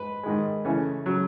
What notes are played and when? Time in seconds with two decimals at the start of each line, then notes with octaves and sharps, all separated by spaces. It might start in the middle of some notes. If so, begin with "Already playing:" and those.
Already playing: G#2 B4
0.23 G#2 D#3 G#3
0.65 C#3 E3 A3 C#4
1.06 C#3 F#3